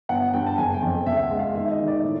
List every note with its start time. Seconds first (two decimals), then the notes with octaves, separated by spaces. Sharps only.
0.09 G1 F#5
0.34 G2 G5
0.46 A5
0.58 F#1 G#5
0.74 G5
0.82 F2
1.06 C#2 E5
1.23 F#5
1.31 G#3
1.39 F5
1.55 D#3 E5
1.71 D#5
1.79 D#3
1.88 D5
2.04 A2